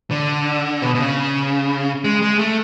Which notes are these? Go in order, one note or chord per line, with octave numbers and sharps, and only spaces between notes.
D3
B2
B2
C#3
G#3
G#3
A3